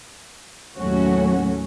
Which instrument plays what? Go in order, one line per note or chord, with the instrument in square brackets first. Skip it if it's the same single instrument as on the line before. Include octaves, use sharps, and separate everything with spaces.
[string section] D#2 A2 F#3 A3 C#4 F#4